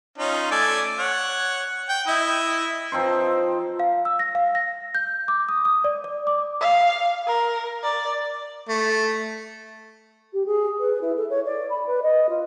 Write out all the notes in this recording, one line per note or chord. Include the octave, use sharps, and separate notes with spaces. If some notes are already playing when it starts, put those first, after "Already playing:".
C#4 D#4 F4
A3 D5 G#5
C#5 F#5
G5
E4 D#5
F3 C4 D#4 C5
F5
E6
A#6
F5
A#6
G6
D6
D#6
D#6
D5
D5
D6
F5
A#4
D5
A3
G4
G#4
B4
E4
A4
C#5
D5
B5
B4
D#5
F4